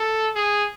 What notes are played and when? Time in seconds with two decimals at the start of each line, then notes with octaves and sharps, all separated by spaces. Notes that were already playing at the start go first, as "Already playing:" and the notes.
Already playing: A4
0.35 G#4